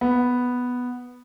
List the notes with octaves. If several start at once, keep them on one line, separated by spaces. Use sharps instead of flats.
B3